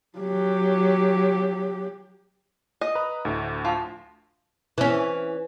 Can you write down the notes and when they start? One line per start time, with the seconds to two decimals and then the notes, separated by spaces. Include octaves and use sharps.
0.19 F#3 G4
2.81 D#5
2.95 B4 A#5 D#6
3.25 D2 A2
3.65 F3
4.78 E3 C#4